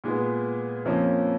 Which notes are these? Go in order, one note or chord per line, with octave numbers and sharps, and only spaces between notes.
A#2 G#3 B3
F2 F3 A#3 C#4